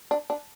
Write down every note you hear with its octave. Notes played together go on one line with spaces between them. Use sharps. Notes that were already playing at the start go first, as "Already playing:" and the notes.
D4
D4